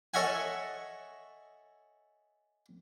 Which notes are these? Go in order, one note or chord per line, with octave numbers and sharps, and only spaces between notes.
A4 C#5 D#5 E5 F#5 G#5